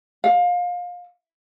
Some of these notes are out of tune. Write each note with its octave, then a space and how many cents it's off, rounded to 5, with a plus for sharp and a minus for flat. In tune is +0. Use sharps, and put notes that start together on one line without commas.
F5 +25